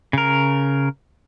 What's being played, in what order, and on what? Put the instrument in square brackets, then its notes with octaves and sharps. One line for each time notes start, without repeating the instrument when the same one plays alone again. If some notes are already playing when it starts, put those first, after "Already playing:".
[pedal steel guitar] C#3 A#4